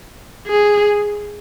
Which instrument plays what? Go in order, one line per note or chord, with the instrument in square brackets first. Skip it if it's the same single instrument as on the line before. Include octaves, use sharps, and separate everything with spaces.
[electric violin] G#4